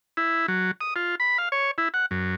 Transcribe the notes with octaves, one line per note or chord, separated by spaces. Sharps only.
E4
F#3
D#6
F4
B5
F5
C#5
E4
F#5
F#2